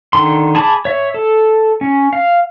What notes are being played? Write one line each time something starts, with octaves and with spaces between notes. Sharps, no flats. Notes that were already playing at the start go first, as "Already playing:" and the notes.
D3 D#3 C6
G#4 A5 B5 D6
C#5 E5
A4
C#4
F5